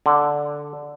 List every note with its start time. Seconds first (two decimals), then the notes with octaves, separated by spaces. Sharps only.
0.06 D3